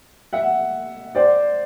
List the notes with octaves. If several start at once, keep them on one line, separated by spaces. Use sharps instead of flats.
E5 F#5
C5 D5